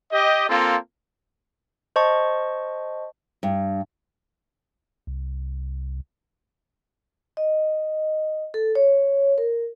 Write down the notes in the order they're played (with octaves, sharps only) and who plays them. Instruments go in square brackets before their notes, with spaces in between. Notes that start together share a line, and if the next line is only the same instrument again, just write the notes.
[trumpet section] G4 D#5
A#3 C4 F4 A4
[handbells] C5 D#5 A5 C#6
[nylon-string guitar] G2
[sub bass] C2
[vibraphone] D#5
A4
C#5
A#4